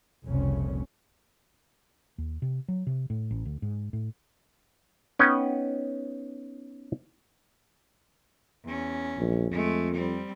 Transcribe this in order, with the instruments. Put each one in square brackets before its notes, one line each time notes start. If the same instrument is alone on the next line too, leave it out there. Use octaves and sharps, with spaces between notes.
[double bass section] F1 C2 A#2 C#3 C#4
[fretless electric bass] D#2
C3
F#3
C3
A2
A1
D2
G#2
A2
[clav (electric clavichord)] B3 C#4 D#4 B4 F#5 G5
[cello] E2 C#4
[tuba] A#1
[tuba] F2 [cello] G#3 A3
[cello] G3 C4